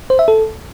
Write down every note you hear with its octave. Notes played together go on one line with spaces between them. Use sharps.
C5
E5
A4